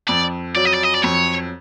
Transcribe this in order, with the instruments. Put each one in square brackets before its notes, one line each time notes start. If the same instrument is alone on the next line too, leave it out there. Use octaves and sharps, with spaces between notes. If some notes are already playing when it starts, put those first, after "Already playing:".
[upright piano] F2 [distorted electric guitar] D5
[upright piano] F#3 [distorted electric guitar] D5
[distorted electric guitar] D#5
D5
D#5
D5
[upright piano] F2 [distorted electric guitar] C#5